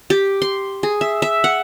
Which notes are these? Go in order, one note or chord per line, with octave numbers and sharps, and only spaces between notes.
G4
C6
G#4
E5
E5
F#5